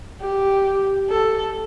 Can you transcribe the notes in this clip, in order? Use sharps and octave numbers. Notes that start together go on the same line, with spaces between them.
G4
A4